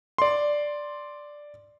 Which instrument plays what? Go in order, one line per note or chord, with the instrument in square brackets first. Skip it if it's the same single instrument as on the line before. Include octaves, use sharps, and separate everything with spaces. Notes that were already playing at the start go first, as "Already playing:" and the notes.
[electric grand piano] D5 C6